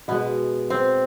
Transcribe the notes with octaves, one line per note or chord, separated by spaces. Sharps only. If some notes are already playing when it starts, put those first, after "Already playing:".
B2 G#3 B3
C4